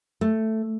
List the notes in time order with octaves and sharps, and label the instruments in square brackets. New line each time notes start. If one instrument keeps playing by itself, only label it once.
[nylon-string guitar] A3